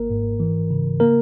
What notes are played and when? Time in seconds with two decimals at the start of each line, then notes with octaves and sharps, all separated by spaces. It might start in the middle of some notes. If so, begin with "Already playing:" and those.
Already playing: G#1 A#3 A#4
0.10 G#2
0.40 E3
0.71 C#3
1.00 A#3 A#4